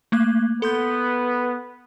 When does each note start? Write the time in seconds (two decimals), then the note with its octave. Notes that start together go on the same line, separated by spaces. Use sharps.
0.12 A3 A#3 F#6
0.62 B3 A4 C6 G6